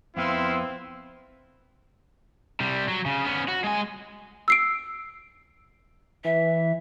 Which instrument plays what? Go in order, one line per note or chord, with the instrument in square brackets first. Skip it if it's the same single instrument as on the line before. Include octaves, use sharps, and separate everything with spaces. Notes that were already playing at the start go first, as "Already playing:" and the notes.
[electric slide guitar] F2 B3 [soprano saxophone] C4 [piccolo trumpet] E4 [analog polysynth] F5 C6 E6
[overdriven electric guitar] C3 G3
F#3
C#3
B3 C#4
F#4
G#3 G#5
[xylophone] E6 C7 D7
[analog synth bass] E3 [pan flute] E5